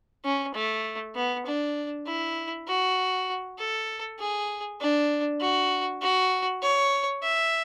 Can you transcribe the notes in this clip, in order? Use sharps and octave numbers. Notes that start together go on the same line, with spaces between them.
C#4
A3
B3
D4
E4
F#4
A4
G#4
D4
F#4
F#4
C#5
E5